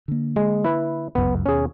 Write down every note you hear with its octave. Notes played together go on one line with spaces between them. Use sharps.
D3 A#3
G#3
E4 B4
G1 C#2 F#2 B3
D#2 B2 C#4 G#4